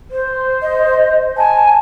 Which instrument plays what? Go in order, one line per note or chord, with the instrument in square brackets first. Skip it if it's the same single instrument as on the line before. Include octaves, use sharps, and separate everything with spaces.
[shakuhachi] C5
[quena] D#5
[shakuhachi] G#5 [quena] A5